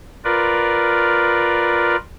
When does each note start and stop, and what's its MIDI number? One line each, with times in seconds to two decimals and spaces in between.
0.24 1.96 65
0.24 1.96 70
0.24 1.96 71
0.24 1.96 74